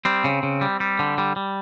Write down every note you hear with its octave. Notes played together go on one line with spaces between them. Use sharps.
G3 C4
C#3
C#3
G3
G3
D3
G3
G3